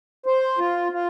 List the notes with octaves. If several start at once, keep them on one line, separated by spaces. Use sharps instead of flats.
C5
F4
F4